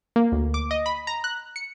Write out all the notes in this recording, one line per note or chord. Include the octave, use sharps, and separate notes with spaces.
A#3
D2
D6
D#5
B5
A#5
F#6
C#7